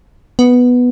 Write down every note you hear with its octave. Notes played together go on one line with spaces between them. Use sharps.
B3